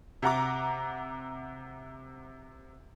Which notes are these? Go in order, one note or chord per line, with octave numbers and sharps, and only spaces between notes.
C3 F#5 A#5 D6